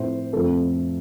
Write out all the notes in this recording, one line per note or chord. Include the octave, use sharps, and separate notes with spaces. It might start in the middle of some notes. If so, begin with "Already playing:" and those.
Already playing: A2 F3 C4 C5
F2 F3 A3 C4 A4